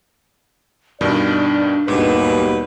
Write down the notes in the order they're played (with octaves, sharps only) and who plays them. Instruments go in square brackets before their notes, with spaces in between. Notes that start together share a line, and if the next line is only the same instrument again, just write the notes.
[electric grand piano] G2 B2 D#3 [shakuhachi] D4 [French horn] D5
[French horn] D#2 [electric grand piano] G#2 [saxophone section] B2 G3 B4